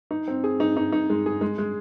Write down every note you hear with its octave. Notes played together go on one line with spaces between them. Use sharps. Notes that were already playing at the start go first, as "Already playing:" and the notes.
D#4
C4
G#4
D#4
D#4
D#4
G#3
G#4
G#3
G#3